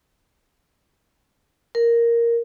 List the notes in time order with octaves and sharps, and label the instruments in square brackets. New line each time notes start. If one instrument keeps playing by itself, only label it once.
[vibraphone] A#4